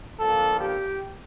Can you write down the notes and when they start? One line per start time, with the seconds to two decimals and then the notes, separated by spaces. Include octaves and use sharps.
0.20 D3 F3 A#3 A4
0.59 G4